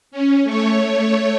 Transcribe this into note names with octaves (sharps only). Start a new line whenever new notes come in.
C#4
A3 C#5